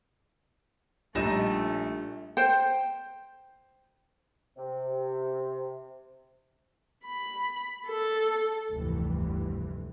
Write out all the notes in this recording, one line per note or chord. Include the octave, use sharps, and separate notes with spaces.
A#1 G3 A3 D4 D#4 F4 A#6 E7
C5 G5
C3
B5
A4
F1 D2 G2 E3